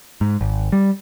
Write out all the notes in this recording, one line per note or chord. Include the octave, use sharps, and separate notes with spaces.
G#2
G#1
G3